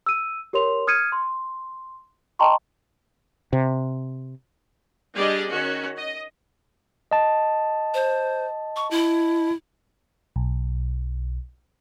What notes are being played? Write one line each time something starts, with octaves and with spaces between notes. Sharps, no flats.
E6 D#7
G4 A#4 C#5 C6 F7
D#6 F6 G#6 C#7 D#7
C6
D#5 G5 A5 A#5 C6 C#6
C3
G3 D4 G4 G#4 D5 D#5
D#3 C#4 F#4
D#5
D#5 A5
C5
C#6
E4
B1